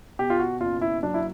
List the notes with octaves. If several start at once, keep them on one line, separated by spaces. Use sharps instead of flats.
B2 G4
F4
F#4
F#1 F4
E4
F#3 D4
E4